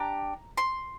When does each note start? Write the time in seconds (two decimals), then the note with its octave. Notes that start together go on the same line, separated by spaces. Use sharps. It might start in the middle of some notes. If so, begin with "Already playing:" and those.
Already playing: D4 G4 A#5
0.57 C6